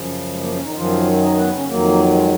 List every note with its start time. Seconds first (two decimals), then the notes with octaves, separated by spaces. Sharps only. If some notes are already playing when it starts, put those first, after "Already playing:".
Already playing: F#2 C#3 F3
0.29 G#3
0.41 A#3
0.52 C#3 C#4
0.63 D#3 D#4
0.75 F#2 D#3 F3 F#3 F4
1.22 D#4 D#5
1.37 B3 B4
1.53 C#3 C#4
1.68 F2 D#3 F#3 A#3
2.14 G#3